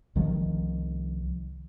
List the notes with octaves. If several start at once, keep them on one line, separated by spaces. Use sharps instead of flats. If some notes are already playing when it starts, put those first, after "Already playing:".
C2 D#3 F3